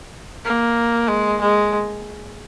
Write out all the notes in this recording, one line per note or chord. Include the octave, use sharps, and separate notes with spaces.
A#3
G#3
G#3